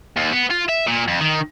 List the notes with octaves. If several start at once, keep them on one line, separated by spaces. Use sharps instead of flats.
D#2
B3
F4
E5
A#2
F2
D#3